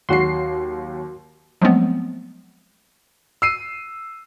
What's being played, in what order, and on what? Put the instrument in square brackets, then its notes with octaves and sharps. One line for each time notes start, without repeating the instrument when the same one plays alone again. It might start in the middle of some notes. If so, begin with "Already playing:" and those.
[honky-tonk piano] D#2 F#3 C7 [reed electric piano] F#4 C6
[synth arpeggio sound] F3 F#3 G#3 A3 B3 C4
[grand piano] E6 C7 D#7